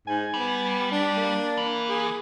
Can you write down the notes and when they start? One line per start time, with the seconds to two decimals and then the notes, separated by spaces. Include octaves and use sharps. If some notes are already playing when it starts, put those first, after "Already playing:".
0.08 G#2 G#5
0.34 G3 B3
0.91 D4
1.17 A#3
1.57 E3
1.89 G#4